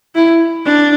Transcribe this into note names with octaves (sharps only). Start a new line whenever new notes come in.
E4
D4